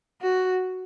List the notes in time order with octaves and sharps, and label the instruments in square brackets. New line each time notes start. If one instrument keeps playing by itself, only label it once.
[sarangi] F#4